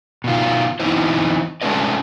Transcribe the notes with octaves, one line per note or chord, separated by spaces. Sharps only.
B2 D#3 F4
E3 B3 C4 D#4 E4 C5
G#3 A3 C#4 D4 B4 D#5